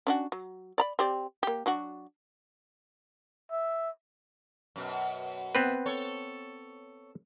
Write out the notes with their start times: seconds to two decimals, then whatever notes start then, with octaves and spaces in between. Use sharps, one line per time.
0.07 C#4 D4 F#4
0.32 F#3
0.78 D5 A#5 B5
0.99 C4 G4 D5
1.43 A#3 G4
1.66 F#3 D4 F#4
3.51 E5
4.76 F#2 B2
5.55 B3 C4 B4
5.86 A4 C#5